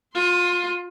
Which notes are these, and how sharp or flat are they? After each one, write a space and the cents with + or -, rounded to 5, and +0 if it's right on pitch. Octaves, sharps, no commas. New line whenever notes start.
F4 +25 C6 +0